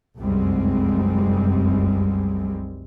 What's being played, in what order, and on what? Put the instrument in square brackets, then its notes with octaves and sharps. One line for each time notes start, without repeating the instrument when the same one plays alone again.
[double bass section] F1 C2 F#2 G3 G#3 C4